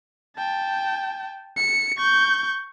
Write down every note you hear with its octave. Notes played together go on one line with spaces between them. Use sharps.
G5 A5
C#7
C#6 G6